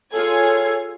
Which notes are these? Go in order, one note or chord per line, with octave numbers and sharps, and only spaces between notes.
F4 G#4 A4 C#5 F5 G#6